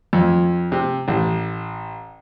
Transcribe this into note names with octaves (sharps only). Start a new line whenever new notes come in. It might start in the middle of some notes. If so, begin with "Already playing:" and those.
F2
C3
A1